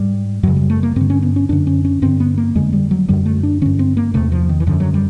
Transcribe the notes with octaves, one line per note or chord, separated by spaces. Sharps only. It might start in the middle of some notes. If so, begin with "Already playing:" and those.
Already playing: G#2 G3
F#2 C#3 F#3
G3
A3
A#3
G2 D3 C4
C#4
B3
C#4
F#2 D3 D4
C#4
C#4
G2 D3 C4
B3
A#3
F2 D3 G#3
G3
F#3
F#2 D3 G3
A3
D4
G2 D3 C#4
C4
A#3
E2 C3 A3
F3
D#3
E3
F#2 D3 F3
F#3
G3